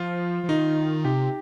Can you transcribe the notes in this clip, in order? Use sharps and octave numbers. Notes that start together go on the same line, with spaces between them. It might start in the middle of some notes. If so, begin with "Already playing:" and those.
Already playing: F3 F4
F3
D#3 D#4
C3 G4